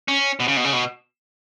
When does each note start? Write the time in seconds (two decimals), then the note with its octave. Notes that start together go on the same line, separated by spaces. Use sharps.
0.08 C#4
0.40 B2
0.48 C#3
0.57 B2
0.64 C#3
0.73 B2